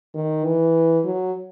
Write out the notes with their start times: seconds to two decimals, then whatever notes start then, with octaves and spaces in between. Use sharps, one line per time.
0.14 D#3
0.45 E3
1.05 F#3